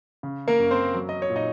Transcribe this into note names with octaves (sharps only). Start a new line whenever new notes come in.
C#3
A#3 A#4
F#2
C4 C5
F#3
D#5
C#5
A#2
D#4 D#5